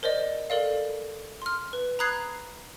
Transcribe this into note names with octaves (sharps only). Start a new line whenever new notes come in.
A#4 C5 D5 D#5
A4 A#4 D5 F5
C6 F6
B4
A#5 B5 D#6 F#6 G#6 C7